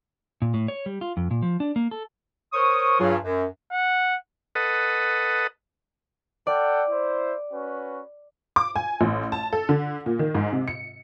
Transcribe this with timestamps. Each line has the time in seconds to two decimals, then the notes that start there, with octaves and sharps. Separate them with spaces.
0.42 A#2
0.54 A2
0.68 C#5
0.86 G3
1.01 F4
1.17 F2
1.31 A#2
1.42 F3
1.60 D4
1.76 A#3
1.91 A4
2.53 A#4 C5 C#5 C#6 D#6
3.00 G2 F#3 F4 G#4
3.23 F#2
3.72 F#5
4.55 A4 B4 D#5 F#5
6.47 A4 D5 F#5 G5
6.89 E4 C5
7.52 C#4 F#4 B4
8.56 D6
8.76 G#5
9.01 A1
9.32 A5
9.53 A4
9.69 D3
10.06 A#2
10.19 D#3
10.35 G#2
10.52 C3
10.68 C#7